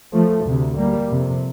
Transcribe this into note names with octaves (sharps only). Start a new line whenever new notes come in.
F3 A3
D2 C3
G3 A#3
F2 C3